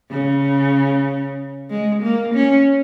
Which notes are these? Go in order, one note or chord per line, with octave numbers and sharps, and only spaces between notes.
C#3
G#3
A#3
C#4